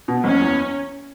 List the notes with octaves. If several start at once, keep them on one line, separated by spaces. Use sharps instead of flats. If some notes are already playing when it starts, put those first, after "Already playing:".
B2
F#1 C#4
E2